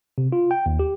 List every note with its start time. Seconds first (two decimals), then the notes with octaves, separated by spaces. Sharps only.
0.18 C3
0.32 F4
0.51 G5
0.66 D#2
0.79 G4